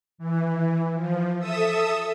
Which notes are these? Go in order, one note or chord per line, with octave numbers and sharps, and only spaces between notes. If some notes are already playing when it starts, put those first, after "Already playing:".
E3
F3
A4 E5 D#6 E6